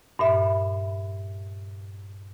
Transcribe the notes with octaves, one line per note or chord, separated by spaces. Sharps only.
G2 A#2 E5 B5